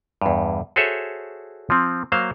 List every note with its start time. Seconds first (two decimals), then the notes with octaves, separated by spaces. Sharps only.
0.22 E2 G2
0.76 F#4 G#4 A4 C5 C#5 E5
1.70 F3 C4
2.12 F#3 A#3 C5 F5